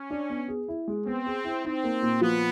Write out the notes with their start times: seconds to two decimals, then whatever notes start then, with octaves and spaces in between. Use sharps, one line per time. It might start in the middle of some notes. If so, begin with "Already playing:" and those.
Already playing: C#4
0.10 D4
0.30 B3
0.48 G#4
0.68 E4
0.88 G#3
1.06 B3 C4
1.26 G#4
1.44 E4
1.65 C4 D#4
1.84 A#3
2.02 A#2
2.21 F3 B3